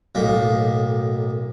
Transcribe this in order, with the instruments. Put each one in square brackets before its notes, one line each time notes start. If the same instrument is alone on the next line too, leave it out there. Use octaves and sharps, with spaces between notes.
[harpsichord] B1 A2 A#3